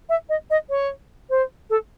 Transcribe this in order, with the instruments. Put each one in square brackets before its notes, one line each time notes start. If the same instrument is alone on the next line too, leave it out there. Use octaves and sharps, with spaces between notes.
[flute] E5
D#5
D#5
C#5
C5
A4